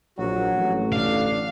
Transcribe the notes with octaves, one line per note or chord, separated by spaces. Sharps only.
A#1 F#3 F#4
A1
D3 D4 F5